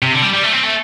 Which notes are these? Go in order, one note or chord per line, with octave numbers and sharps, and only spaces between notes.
C3
D3
G3
G3
A3
C4
A3